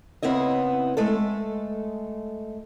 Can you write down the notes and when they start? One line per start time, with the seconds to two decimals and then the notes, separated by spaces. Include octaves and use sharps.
0.23 C#3 B3 C4 E4 D#5
0.97 G#3 A3 A4